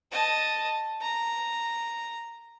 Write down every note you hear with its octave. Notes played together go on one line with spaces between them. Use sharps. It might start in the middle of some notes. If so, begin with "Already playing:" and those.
D#5 A5
A#5